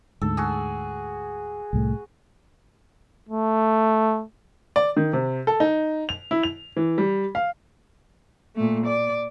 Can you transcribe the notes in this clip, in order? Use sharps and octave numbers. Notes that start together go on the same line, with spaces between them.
D2 G#2 A4
F#4 G#4
C2 A2 A3
A3
D5
D#3
C3
A4
D#4
F7
E4
F7
E3
G3
F5
A#2 A3
D5